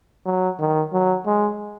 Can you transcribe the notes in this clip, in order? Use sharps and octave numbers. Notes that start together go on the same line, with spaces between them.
F#3
D#3
F#3
G#3